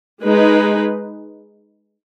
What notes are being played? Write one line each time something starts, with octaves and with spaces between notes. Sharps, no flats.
G#3 D#4 G#4 B4